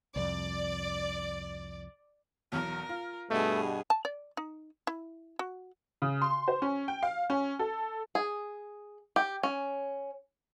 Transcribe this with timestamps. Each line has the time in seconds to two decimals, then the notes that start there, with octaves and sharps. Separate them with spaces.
0.16 C2 F2 D5
2.52 B1 E2 A#4 F6
2.89 F4
3.30 G2 B2 A3 G#4 D#5
3.90 A5
4.05 D5
4.37 D#4
4.87 E4
5.39 F#4
6.02 C#3
6.21 C6
6.48 C5
6.62 C#4
6.88 G5
7.03 F5
7.30 C#4
7.59 A4
8.15 G#4
9.16 G4
9.43 C#4